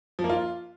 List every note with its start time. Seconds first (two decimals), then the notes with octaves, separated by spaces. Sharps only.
0.19 F3
0.24 A#3
0.29 F4